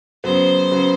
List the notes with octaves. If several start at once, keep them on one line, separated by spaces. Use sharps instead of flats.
C#3 F#3 B3 C5
C#3 F#3 B3